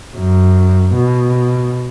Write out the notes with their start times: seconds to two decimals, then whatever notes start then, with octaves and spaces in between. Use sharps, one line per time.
0.16 F#2
0.95 B2